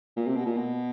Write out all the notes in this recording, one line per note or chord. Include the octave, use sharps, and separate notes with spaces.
A#2
C3
B2
A#2
B2